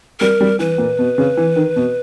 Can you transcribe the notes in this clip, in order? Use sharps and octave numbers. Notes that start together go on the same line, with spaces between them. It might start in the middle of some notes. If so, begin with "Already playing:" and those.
G3 A#4
G3
E3 B4
A#2
B2
C#3
E3
D#3
B2